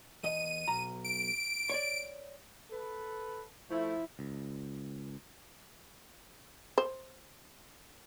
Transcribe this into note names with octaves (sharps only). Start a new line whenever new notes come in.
E2 D#5 D#7
B1 A#5
D7
C#5 D5
A4 B4
F3 A3 E4
C#2
C5